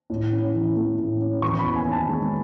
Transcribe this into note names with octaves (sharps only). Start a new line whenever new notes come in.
A2
C#4
E3
A3
A2
C#4
E2 C#6
B5
B3
G#5
D#3 A5
G#3